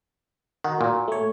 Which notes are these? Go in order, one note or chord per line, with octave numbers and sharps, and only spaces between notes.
D#3 F#4
A#2
A3 C#5